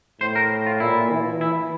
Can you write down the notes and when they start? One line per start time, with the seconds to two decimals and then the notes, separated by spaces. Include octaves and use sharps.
0.20 A2 C5
0.36 A#4
0.66 F4
0.80 A#2 E4
1.11 E3
1.41 E3 E4